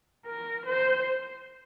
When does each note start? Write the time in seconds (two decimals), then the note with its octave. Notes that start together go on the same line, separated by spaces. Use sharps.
0.26 A#4
0.66 C5